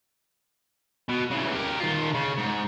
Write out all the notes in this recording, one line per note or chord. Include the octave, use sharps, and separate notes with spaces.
B2
C#3 E3
G4 A#4
D#3 F4
C#3
G#2